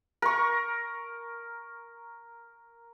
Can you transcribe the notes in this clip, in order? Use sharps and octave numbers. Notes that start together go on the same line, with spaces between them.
A#4 C#6